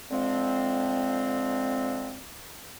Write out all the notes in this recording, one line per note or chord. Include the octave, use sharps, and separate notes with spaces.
D3 F3 G#3 C4